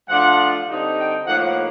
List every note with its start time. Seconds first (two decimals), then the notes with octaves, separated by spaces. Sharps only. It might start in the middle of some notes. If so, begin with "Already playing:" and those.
0.09 F3 A3 D4 F4 F#5
0.68 D3 G3 C4 D#4
0.98 G5
1.27 A2 F3 A#3 D#4 F#5